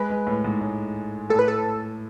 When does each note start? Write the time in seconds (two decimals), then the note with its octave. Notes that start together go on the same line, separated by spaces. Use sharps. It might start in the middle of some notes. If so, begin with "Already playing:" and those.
Already playing: G#3 B4
0.10 G#3
0.27 A2
0.45 G#2
0.61 A2
1.30 A2 A4
1.39 B4
1.48 A4